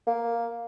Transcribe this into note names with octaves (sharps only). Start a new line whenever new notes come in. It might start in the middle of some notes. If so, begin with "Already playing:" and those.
A#3